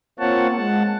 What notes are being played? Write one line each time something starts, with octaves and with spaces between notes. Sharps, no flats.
A#3 C4 F4 C#5 F#5 A5
G#3 F#5 A5